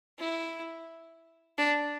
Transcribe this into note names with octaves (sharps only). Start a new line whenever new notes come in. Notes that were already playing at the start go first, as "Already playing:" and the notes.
E4
D4